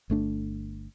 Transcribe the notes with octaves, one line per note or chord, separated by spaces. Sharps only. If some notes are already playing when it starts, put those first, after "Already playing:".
G1 A3 D4